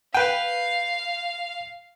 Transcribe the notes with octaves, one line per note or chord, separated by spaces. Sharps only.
B4 F5 G5